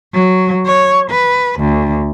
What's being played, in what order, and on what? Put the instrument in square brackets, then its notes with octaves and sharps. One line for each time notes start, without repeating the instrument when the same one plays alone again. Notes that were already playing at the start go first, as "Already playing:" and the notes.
[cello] F#3
C#5
B4
D2